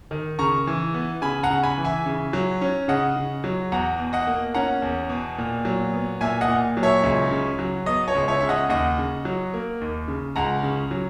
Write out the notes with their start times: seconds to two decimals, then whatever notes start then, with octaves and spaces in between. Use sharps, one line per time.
0.11 D#3
0.39 C#3 A#5 C#6
0.67 E3
0.94 B3
1.22 C#3 G#5 B5
1.43 F#5 A#5
1.50 C#3
1.63 G#5 B5
1.78 E3
1.84 E5 G#5
2.06 C#3
2.33 F#3
2.61 C#4
2.88 C#3 D#5 F#5
3.16 C#3
3.44 F#3
3.72 E2 F#5 A#5
3.99 B2
4.13 D#5 F#5
4.27 A#3
4.54 C#4 F#5 A#5
4.82 E2
5.10 B2
5.38 A#2
5.65 F#3
5.94 B3
6.21 A#2 E5 G#5
6.41 D#5 F#5
6.48 A#2
6.77 F#3
6.83 C#5 E5
7.03 C#2
7.31 C#3
7.59 F#3
7.86 B3 D#5
8.08 C#5
8.15 C#2
8.28 C#5 E5
8.40 C#3 E5
8.49 D#5 F#5
8.69 D#2 D#5 F#5
8.98 C#3
9.25 F#3
9.54 A#3
9.81 D#2
10.08 C#3
10.36 C#2 F#5 A#5
10.63 C#3
10.91 F#3